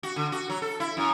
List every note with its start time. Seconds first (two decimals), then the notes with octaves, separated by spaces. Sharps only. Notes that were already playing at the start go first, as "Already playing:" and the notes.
0.03 F#4
0.16 D3
0.32 F#4
0.49 F#3
0.62 A4
0.80 E4
0.97 F#2